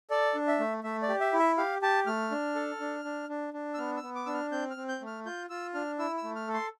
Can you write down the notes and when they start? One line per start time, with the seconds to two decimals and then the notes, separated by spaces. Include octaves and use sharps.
0.11 A4 D5
0.35 D4
0.48 E5
0.60 A3
0.84 A3 E5
1.03 D5
1.09 G4
1.21 E5
1.33 E4
1.39 E5
1.58 G4 F5
1.82 G4 A5
2.07 A3 F6
2.31 D4
2.55 A4
2.80 D4
3.05 D4
3.29 D4
3.54 D4
3.74 E6
3.78 B3 F6
3.97 E6
4.03 B3
4.15 D6
4.26 D4 E6
4.34 F6
4.52 C4 G6
4.70 F6
4.77 C4
4.89 G6
5.01 A3
5.07 F6
5.26 F4 G6
5.50 F4 E6
5.74 D4 F6
5.99 E4 E6
6.17 E6
6.24 A3
6.36 F6
6.48 A4
6.54 C6